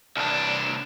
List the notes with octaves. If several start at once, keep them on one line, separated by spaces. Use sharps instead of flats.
C2 D4